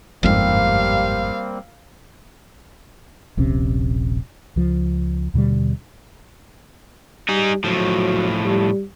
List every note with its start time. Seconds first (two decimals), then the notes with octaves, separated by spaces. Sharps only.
0.23 G1 F2 G#2 G3 A#3 C4 F5
3.37 D#1 A#1 C3 C#4
4.56 C#2 F3
5.34 D#2 B2 D3 G3
7.29 G3 D#4 G#4
7.64 A2 F3 F#3
8.45 G3